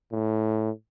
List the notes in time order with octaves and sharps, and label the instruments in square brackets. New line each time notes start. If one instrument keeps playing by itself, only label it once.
[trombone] A2